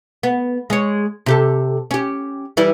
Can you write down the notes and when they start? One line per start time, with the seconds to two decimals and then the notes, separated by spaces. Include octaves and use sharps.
0.23 B3
0.70 G#3 C#5
1.26 C3 G4 A4
1.91 C#4 G4
2.57 E3 G3 E4